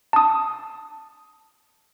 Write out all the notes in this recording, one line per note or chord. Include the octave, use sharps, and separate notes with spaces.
A5 D#6